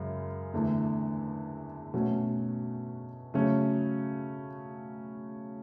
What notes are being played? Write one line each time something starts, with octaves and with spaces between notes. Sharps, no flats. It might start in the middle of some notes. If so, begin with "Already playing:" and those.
Already playing: F#2 C#3 G#3
E2 D3 A3
B2 A3 C#4 F#4
C#3 F#3 A3 C#4